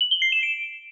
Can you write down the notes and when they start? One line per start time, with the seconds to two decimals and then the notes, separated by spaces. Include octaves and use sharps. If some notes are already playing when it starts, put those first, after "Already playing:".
0.01 F#7
0.11 G7
0.22 C7
0.32 E7
0.43 D7